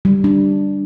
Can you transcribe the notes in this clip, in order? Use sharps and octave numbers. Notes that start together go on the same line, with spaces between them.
G3
D4